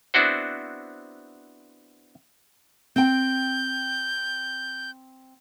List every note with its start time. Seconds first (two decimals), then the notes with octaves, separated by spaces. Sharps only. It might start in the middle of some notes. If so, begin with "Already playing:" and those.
0.14 B3 C4 D4 E4 F#4 C5
2.96 C4 G5 G6